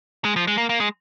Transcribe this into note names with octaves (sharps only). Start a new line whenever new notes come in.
G#3
F3
G#3
A#3
A#3
G#3